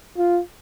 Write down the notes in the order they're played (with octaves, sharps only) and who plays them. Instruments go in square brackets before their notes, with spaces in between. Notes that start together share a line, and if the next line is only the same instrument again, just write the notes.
[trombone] F4